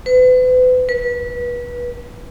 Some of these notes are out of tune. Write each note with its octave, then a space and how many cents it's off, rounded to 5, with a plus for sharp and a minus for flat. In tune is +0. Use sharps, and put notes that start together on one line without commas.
B4 +40
B4 -25